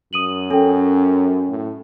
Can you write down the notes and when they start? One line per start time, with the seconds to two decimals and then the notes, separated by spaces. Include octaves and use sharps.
0.13 F#2 D#6 D#7 F#7
0.51 C#4 A4 G5
1.49 A2